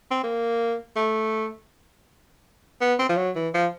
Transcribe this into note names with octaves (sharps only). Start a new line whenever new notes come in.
C4
A#3
A3
B3
C4
F3
F#3
E3
F3